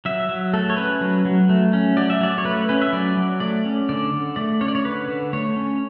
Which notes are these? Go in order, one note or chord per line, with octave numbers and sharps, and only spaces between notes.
F#3 E5
F#3
A3 A4
C#5
C#4 B4
F#3
F#3
A3
C#4
F#3 D5
E5
F#3 D5
C#5
A3 B4
C#4 B4
E5
F#3 D5
F#3
A3 D5
C#4
D3 D5
D3
A3 D5
C#4 C#5
D5
C#5
D3 B4
D3
A3 C#5
C#4